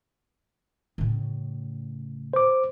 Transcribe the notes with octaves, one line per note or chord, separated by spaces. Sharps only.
A2 C#3
C5 D6